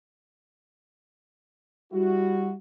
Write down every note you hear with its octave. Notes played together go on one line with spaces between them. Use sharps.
G3 E4 F#4